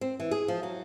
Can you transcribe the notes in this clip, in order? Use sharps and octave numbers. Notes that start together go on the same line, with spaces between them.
C4
E3
G#4
F3
F#3